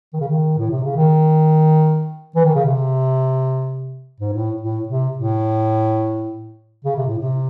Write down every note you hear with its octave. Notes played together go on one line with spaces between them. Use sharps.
D#3
C#3
D#3
A2
C3
C#3
D#3
E3
D#3
C#3
C3
G#2
A2
A2
C3
A2
C#3
C3
A2
C3